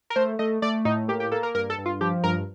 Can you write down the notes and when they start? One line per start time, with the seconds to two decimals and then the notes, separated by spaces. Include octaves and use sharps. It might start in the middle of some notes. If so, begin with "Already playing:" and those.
0.10 A#4
0.16 A3 C5
0.39 A3 D#5
0.62 A3 D5
0.85 A2 D#4
1.08 A#3 G4
1.20 G4
1.31 A#3 A4
1.43 A#4
1.55 G2 A#4
1.70 A4
1.78 G2
1.86 F4
2.01 F3 G4
2.24 G2 A#4